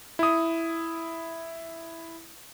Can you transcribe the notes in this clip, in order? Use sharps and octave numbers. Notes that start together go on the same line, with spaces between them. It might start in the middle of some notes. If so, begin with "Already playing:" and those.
E4 D#6